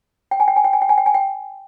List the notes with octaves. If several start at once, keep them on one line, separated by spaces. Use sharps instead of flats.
G5
G#5
G5
G#5
G5
G#5
G5
G#5
G5
G#5
G5